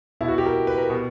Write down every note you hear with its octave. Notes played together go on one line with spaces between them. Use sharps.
B2 E4
F#4
G4
A#4
B4
A#4
B2